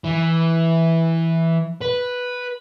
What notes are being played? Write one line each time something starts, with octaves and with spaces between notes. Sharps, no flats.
E3
B4